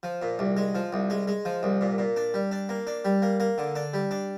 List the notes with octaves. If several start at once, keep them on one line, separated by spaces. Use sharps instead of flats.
F3
A#2
C2
G#3
F3
C2
G#3
G#3
F3
C2
A#2
A#2
D4
G3
D4
A#3
D4
G3
A#3
A#3
D3
D4
G3
D4